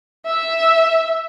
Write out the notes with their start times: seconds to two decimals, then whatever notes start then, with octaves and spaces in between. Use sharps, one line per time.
0.26 E5